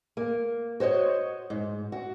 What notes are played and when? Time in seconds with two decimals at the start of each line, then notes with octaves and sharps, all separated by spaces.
0.17 A#3
0.80 F#4 C5 C#5 D#5
1.50 G#2
1.92 F#4